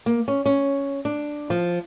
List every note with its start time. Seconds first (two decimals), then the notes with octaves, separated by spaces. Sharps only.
0.06 A#3
0.28 C#4
0.46 C#4
1.05 D4
1.50 F3